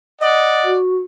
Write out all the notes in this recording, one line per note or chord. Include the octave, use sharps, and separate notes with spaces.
D5 D#5 F#5
F#4